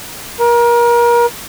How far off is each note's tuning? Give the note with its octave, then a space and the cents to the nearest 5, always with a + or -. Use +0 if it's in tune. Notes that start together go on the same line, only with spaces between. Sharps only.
A#4 +30